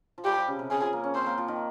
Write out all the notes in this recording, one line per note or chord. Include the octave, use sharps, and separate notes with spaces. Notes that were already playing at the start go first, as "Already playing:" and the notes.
F3
G3 G4
F3
C#3
C3
C#3 G#4
F3
A#3
C#4
C4 C5
A#3
F3
D#3